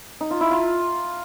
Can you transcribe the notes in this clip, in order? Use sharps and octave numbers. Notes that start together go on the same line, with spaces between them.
D#4
F4
E4
F4